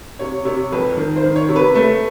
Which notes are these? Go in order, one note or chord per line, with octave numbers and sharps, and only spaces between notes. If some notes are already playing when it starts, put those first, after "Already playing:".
C3 C#5
C3 C#5
F2 B4
D#3
C5
D#3
C#5
C3
B4
A3 B4